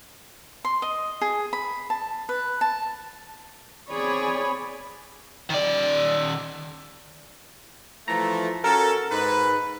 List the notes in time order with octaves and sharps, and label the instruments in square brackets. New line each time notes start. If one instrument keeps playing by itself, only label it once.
[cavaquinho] C6
D#5
G#4
B5
A5
B4
A5
[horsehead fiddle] C4 G#4 [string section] C#5 D5 B5
[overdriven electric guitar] D#3 D5
[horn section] E3 F3 A3 [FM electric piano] A#5
[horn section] C#4 F#4 A4 [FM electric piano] A#4
[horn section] G#2 B4